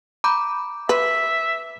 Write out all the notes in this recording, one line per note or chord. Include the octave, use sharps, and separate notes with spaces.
A#5 B5 D6 G6
B4 E5